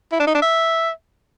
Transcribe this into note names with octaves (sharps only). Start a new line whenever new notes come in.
E4
D4
D#4
D4
E5